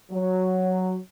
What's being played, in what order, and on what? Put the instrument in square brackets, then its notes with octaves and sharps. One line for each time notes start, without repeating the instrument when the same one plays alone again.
[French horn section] F#3